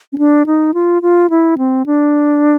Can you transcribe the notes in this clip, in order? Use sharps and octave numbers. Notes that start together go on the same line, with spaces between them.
C#4
D4
D#4
F4
F4
E4
C4
D4